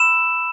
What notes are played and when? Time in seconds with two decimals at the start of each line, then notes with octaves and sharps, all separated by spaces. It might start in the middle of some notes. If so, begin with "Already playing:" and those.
Already playing: B5 E6 E7